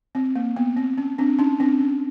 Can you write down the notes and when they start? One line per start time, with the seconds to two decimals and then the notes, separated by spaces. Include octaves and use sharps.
0.15 C4
0.36 A#3
0.56 B3
0.77 C4
0.98 C#4
1.18 C4 D4
1.39 C#4 D#4
1.60 C4 D4
1.80 C#4